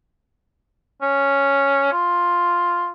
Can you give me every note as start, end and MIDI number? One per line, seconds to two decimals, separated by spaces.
1.02 1.91 61
1.92 2.89 65